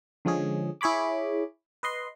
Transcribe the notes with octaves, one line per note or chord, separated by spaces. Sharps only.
D3 F3 G#3 C#4 G#4
E4 G#4 C#5 B5 D6
B4 D#5 C6